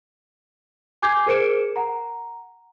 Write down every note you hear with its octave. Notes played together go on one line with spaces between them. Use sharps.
G#5 D6 G6 G#6 C7
G#4 A#4 C5 C#7 D7 E7
F#5 A#5